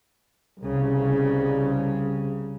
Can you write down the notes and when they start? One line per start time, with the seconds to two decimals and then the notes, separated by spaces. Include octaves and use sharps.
0.60 C2 C#3